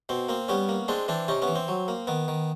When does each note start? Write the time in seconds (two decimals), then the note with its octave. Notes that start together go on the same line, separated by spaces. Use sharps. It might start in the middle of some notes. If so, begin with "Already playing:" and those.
0.09 B2 C4
0.29 A#3 C4
0.48 G3 B3 C#4
0.69 A#3
0.88 G#3 C4 D4
1.08 E3 C4 D4
1.28 C3 C#4 D#4
1.42 B3 C#4
1.48 E3
1.55 C4
1.68 F#3
1.88 A#3
2.07 D#3 B3
2.28 D#3